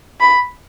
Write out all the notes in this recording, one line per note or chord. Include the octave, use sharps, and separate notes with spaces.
B5